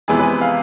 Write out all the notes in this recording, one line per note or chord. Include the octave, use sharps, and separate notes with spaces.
F2 C3 E3 G#3 B3 G#4
B4
F5